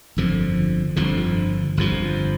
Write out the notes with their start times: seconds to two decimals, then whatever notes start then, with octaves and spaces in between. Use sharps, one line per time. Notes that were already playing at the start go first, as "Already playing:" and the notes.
0.17 G1 F2 D3 F3
0.96 G1 F2 D3 F3
1.77 G1 F2 D3 F3